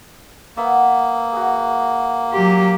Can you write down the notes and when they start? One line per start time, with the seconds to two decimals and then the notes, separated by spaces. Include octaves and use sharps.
0.57 A#3 B3 E5 F#5
1.33 F#4 G#4
2.33 F#3 F4 G4